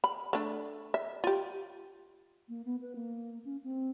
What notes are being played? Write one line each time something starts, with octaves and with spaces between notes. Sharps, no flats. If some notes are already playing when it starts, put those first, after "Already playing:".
B5
A3 D4
E5
F4 G4
A#3
B3
B4
A#3
C#4
C4